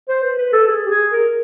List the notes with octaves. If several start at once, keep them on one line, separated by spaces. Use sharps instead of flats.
C5
B4
B4
A4
G#4
G4
G#4
A#4